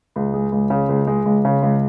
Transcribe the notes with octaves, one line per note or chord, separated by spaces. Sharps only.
C#2
G#3
C#2
C#3
C#2
G#3
C#2
C#3
C#2